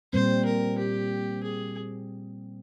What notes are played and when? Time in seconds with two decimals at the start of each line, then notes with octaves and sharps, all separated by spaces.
0.13 A#2 G3 C4 C5
0.46 A#4
0.78 G4
1.43 G#4